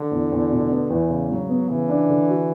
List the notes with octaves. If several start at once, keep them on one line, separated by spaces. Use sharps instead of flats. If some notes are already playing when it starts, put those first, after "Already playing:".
Already playing: D3
E2
E2
B2
B3
E2 E3
C#3
G#2 F#3
B3
C#3 E3
D4
D3
F#4